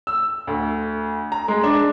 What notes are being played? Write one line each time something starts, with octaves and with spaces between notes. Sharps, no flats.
E6
D2
A#5
G#3
D4